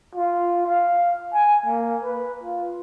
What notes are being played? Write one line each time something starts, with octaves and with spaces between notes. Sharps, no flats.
F4
F5
G#5
A#3
B4
F4